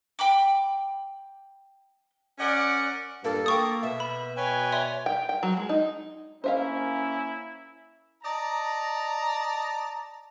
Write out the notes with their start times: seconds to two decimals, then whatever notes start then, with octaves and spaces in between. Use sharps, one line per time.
0.19 G5 B5 D6
2.39 C#4 A#4 D5 F#5
3.24 G2 A#2 A#3 A4
3.46 A#3 G5 C#6 D#6
3.83 B2 E5
4.00 B5
4.37 B4 C#5 G5 G#5
4.72 D5 E5 C6
5.06 G5
5.29 G5
5.43 F#3
5.57 G#3
5.69 D#4
6.44 A#3 C#4 E4 C5 E5 F5
8.23 D5 D#5 A5 A#5